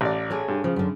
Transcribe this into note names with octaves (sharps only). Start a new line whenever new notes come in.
A1 D5
G#4 A4 C#5
G2
C#3 F3
F#2 D3